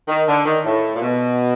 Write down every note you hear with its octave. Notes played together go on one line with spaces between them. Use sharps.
D#3
D3
D#3
A2
A#2
B2